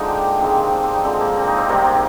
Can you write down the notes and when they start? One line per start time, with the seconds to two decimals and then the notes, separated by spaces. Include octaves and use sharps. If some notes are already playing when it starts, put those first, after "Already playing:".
Already playing: D3 F3 G#3 D#4
0.08 G4
0.25 A#3
0.41 C3 D#3 G#3 C4
0.51 A#3
0.63 C4
0.73 D4
0.83 C4
0.94 D#4
1.04 D3 F3 G#3 C4
1.21 A#3
1.37 C4
1.47 D#4
1.58 C4
1.69 C3 D#3 G3 A#3
1.85 A#3